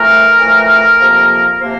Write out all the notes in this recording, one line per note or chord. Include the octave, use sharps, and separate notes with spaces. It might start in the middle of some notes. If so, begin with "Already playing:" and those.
Already playing: F2 E3 A3 A#4
F2 E3 A3
F2 C3 F3 A#3
C3 F3 A#3 C5